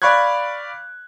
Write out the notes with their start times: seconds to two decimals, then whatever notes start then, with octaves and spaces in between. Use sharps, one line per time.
0.02 D5 F5 B5 C#6 F#6 G#6